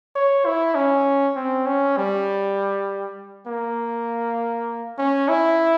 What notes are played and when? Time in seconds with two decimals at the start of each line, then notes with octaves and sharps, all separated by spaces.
0.16 C#5
0.46 E4
0.76 C#4
1.36 C4
1.67 C#4
1.97 G3
3.47 A#3
4.98 C#4
5.29 E4